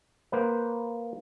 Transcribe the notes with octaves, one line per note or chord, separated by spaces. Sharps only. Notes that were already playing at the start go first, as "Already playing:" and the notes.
A#3 B4 C5